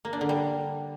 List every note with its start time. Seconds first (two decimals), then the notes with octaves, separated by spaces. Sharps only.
0.05 A#3
0.13 D4
0.21 D3
0.29 G3